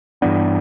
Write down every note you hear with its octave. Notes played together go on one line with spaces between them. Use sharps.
G2 E3 B3 D4